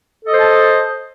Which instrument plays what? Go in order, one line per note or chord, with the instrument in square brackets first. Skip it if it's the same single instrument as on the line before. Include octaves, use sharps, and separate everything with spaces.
[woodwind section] A4
D#5
C5
A5